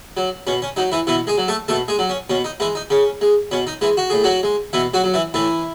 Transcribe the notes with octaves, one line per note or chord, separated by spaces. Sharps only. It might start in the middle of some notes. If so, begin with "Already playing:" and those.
F#3
B2 C#4
C#4
F#3 D#4
E3 E4
B2 E3 E4
G#3 G#4
F#3
A3 A4
B2 A3 A4
G#3 G#4
F#3
C#4
B2 C#4
D#4
E3 G#3 E4
D#4
C#3 C#4
G#3
B2 C#4
D#4
E3 G#3 E4
F#4
A2 G#4
F#3 F#4
G#3
B2 E3 E4
F#3 F#4
F#3
E3 E4
A2 E3 E4